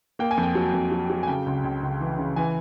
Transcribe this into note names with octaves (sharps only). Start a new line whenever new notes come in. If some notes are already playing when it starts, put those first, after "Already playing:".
A#3 G5
G#5
F2
G5
F#3
F2
F#3
F#3
G#5
C#3 G5
C#2
C#2
C#2
E3
C#3
E3 G#5